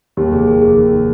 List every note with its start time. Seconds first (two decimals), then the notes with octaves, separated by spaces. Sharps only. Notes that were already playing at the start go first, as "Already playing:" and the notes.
0.17 D#2 G4
0.32 F1 G#4
0.47 D#3 G#4
0.62 F1 G#4
0.77 D#3